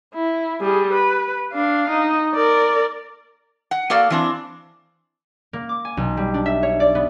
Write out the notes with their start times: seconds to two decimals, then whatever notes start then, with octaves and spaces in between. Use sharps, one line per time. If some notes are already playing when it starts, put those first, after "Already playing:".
0.15 E4
0.61 G3 G#4
0.93 B4
1.53 D4 F5
1.90 D#4
2.34 A#4 D5
3.71 F#5
3.90 A#3 F#4 A4 D5 F5
4.10 E3 C4 D4
5.53 A#3
5.69 D6
5.85 G#5
5.97 B1
6.17 G3
6.34 D4
6.46 E5
6.63 C#5
6.80 D5
6.95 B3